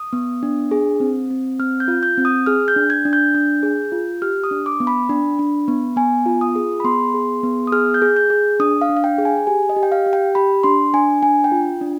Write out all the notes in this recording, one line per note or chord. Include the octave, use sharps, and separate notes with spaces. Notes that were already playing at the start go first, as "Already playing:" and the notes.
Already playing: D#6
B3
D4
G#4
C4
C4
C4 F6
G6
F4
G6
C4
D#6
G#4 F6
G6
D4
G#6
D4
G6
D4
G#4
F4
G4 F6
D#6
D4
D6
B3
B5
D4
D4
B3
B3 G#5
F4
D#6
G#4
B5
B3 C6
G#4
B3
D#6
G#4 F6
G6
G#4
G6
G#4
D4 D#6
F5
D4
F5
G5
G#4
G#5
G4 G#5
D#5
G4
G5
F5
G4
G5
G4 B5
D4 C6
D4 G#5
D4 G#5
G5
F4
D4